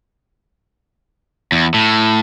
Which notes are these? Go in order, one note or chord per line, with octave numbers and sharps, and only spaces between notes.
E2
A2